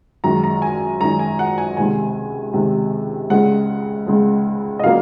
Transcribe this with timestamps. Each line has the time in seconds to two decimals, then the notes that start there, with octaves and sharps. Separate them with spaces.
0.24 F#2 D#3 G#3 A#5
0.44 A#5
0.62 G#5
1.01 F#2 D#3 G#3 A#5
1.19 G#5
1.39 F#5
1.58 G#5
1.77 C#2 C3 D#3 G#5
2.54 C#2 C3 D#3
3.30 C#2 C#3 G#3 F#5
4.07 C#2 C#3 G#3
4.79 D#5
4.83 C#3 F#3 A#3 F5